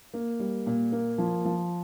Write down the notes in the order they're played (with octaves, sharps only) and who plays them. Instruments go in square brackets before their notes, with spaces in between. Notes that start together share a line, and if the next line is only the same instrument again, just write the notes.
[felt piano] A#3
G3
A#2
A#3
F3
F3